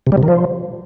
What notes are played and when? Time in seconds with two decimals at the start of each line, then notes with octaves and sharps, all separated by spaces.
0.07 C3
0.12 G3
0.17 C3
0.23 D#3
0.28 F3